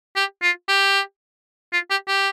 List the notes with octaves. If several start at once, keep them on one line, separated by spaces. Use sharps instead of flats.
G4
F4
G4
F4
G4
G4